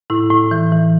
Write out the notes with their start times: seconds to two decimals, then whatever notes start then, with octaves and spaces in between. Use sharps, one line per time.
0.10 A2 E4
0.30 A2
0.51 E3
0.72 E3